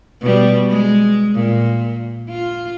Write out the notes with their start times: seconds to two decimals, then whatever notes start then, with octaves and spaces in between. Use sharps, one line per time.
0.22 B2 G3
0.70 G#3
1.35 A#2
2.29 F4